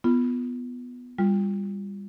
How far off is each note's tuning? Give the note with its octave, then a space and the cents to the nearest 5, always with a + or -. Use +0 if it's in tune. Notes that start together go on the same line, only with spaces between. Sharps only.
B3 +0 F4 -20
G3 +20 F4 +0